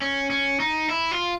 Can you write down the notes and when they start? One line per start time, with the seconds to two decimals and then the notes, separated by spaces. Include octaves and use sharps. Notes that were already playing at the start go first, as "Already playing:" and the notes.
0.02 C#4
0.30 C#4
0.60 D#4
0.90 E4
1.11 F4